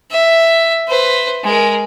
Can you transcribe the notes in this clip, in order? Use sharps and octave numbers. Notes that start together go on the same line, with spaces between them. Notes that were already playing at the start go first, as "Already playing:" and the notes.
E5
B4 C5
G#3 A#4